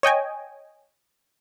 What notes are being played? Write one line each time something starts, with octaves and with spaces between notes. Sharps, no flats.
C#5 D#5 G5 G#5